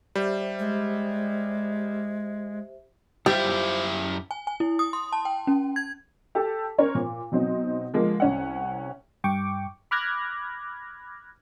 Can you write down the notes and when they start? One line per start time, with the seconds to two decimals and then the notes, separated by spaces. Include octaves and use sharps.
0.15 G3 G4 C5 E5
0.59 G#3
3.26 F#2 F3 G3 E4 G4 E5
4.31 G#5
4.47 G#5
4.60 E4
4.79 D#6
4.93 C6
5.13 A5
5.25 G5
5.47 C#4
5.76 G#6
6.35 G4 A4 A5
6.78 C#4 A#4 C5 C#5
6.95 A#2
7.32 B2 F#3 C4 D#4
7.93 D3 F3 G#3 A#3
8.20 C2 C#4 F#5
9.24 G2 G5 C#6 D6
9.91 B5 D6 F6 F#6 G#6 A#6